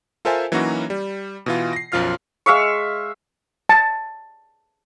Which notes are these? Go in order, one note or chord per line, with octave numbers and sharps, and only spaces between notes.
F4 A4 A#4 C5 E5 G#5
E3 F#3 A#3 C#4 D#4 F#4
G3
B2 E3 F4
A#6 C7
B1 F#2 F3 F4 F6 C7
G#3 E5 F5 C#6
A5